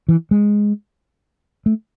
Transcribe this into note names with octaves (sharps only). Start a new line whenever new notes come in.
E3
G#3
A3